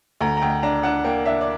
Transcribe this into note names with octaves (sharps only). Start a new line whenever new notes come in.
D2 A#5
A#5
D2 G5
D4 A#5
D4 F#5
A#3 G5
D4 E5
D5